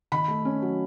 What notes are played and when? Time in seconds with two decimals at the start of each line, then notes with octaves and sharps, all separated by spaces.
0.12 D#3 B5
0.28 A3
0.45 C#4
0.62 F#3